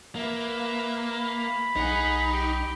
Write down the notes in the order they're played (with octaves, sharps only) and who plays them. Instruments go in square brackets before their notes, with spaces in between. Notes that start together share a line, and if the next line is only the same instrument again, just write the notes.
[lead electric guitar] A#3 [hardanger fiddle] B4 E5
[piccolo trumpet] B5
[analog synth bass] B1 [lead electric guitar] D#4 [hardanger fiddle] G#4 F#5
[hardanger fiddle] G4